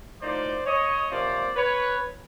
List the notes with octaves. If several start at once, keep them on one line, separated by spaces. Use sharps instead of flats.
A2 F3 A#3 D#4 C5 D5
C#5 D#5
C3 F3 A#3 C#4 C5 D5
B4 C#5